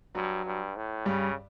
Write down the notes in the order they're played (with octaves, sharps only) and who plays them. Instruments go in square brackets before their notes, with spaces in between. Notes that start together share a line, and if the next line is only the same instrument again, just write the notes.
[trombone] G2 [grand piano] F#3
[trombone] G2
A2
[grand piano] G2 G3 [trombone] C#3